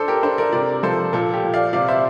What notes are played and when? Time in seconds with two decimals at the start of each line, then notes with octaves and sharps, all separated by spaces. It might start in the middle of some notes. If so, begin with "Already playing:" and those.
Already playing: D4 A4 C5
0.08 G4 A#4
0.23 D4 A4 C5
0.38 A#4 D5
0.52 C3 A#4 D5
0.83 F3 A4 C5
1.13 A#2 A4
1.34 G4
1.43 A#2
1.53 D5 F5
1.73 C3 D5 F5
1.88 C5 E5